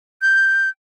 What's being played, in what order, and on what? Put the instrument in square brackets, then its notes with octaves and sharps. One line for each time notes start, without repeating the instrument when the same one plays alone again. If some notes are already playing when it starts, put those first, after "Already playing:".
[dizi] G6